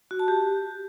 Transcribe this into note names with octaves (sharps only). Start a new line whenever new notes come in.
F#4
A5
G4